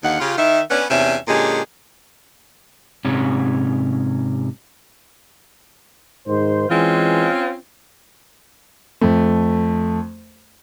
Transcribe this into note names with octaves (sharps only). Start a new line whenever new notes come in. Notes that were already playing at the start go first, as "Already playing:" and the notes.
D#2 D3 D#3 F5 F#5
C#3 F4 G4
D#3 E5
B3 C#4 D4
E2 C3 C#4 D4 E5
A#2 D3 G#3 C#4 G4 G#4
G#2 C3 C#4
G#2 D#3 C5
E3 G#3 C4 C#4 F4
F2 A3